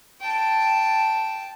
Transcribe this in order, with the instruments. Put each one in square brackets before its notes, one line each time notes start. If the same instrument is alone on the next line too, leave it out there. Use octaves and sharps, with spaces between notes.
[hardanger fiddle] G5 A5